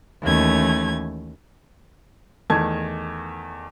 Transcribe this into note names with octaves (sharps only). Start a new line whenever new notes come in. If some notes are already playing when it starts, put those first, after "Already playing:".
D#2 E3 A3 C#4 G#6
E2 D#3 A3 A5 G#6